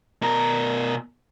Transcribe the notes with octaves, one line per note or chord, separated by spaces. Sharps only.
B2 A#4